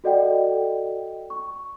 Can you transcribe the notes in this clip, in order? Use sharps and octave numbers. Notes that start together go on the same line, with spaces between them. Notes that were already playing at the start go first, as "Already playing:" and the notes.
F#4 A4 D5 D#5 F#5 G5
C#6